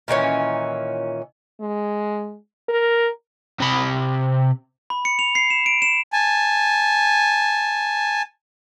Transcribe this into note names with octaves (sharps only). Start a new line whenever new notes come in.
A#2 D#3 E3 C#4
G#3
A#4
C3 B5
B5
C#7
F7
C7
E7
D7
E7
G#5 A5